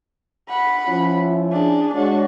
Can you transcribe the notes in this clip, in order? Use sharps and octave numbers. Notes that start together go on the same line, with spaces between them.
F#5 B5
F3 C#4 E4
D4 G#4
G#3 D4 F#4 C#5